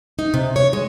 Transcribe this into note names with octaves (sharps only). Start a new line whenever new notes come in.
D#4
C3
C#5
G#3